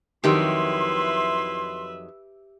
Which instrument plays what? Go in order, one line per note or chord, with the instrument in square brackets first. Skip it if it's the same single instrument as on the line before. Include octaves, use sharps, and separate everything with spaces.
[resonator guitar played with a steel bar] F2 D#3 F#3 [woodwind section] E4 C6 [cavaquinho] G4 [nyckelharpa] B4 E5